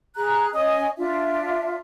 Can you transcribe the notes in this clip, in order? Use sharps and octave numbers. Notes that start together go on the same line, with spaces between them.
G#4 A#5 F#6
C#4 D#5 G#5 D#6
D4 F4 E5